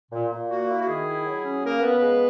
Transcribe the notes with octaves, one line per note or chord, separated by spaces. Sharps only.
A#2
A#2
A#3 F#4
E4
F#4
D#3 G#4
E4
F#3
C#4
C#3 A#3 A#4
C#3 B3 B4
G#3